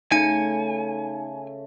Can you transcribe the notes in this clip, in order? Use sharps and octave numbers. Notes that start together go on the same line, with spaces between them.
C#3 A3 D#4 G#5